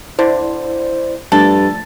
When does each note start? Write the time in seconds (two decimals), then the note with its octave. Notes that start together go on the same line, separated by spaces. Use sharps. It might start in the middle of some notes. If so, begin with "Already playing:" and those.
0.19 D3 E4 C5 D5
1.32 G2 F3 A3 D4 A4 A6